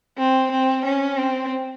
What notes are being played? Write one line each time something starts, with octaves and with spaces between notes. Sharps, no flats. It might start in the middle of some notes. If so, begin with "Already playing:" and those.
C4
C4
C#4
C4